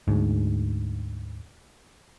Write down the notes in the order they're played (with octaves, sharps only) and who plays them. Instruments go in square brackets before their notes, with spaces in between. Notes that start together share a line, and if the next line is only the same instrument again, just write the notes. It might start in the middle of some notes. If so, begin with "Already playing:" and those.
[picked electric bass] D2 G#2